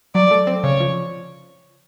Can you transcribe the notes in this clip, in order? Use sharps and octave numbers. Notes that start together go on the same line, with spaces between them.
F#3 D5
A3
C4
C#3 C#5
F3